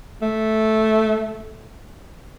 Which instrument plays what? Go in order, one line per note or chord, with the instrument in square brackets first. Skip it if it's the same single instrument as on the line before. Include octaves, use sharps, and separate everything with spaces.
[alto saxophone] A3